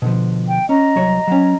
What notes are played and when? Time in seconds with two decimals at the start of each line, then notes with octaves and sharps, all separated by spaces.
0.02 B2 D3 F3
0.48 G5
0.69 C#4 D#5 A#5
0.96 C2 F#3 C#5
1.27 F#3 C#4